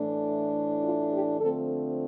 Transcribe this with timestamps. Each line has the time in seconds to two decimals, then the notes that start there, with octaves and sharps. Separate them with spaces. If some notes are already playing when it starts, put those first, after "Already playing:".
Already playing: A2 E3 A3 D4
0.83 F4
1.11 G4
1.40 D3 F3 A3 C4 A4